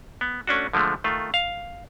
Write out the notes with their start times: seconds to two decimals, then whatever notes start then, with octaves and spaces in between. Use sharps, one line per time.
0.21 B3
0.47 A3 C#4 D4 F#4
0.73 D3 F3 G#3 A3
1.04 D#3 A3 F4
1.34 F5